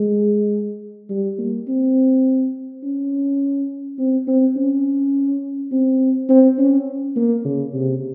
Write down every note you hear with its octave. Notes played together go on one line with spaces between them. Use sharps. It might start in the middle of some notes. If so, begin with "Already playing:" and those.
Already playing: G#3
G3
A#3
C4
C#4
C4
C4
C#4
C4
C4
C#4
A#3
C#3
C3